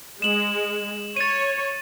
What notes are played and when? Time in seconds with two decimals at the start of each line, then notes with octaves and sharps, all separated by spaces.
0.22 G#3 E7 F#7
1.17 C#5 A6 D#7